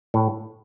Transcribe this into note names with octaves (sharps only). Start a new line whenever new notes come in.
A2